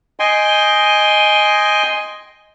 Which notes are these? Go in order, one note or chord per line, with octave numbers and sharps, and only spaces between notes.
D#5 G5 G#5 C6